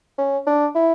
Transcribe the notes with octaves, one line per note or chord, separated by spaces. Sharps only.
C#4
D4
E4